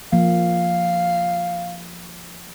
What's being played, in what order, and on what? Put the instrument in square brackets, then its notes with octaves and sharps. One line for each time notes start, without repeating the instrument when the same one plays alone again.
[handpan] F3 A#3 [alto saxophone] F5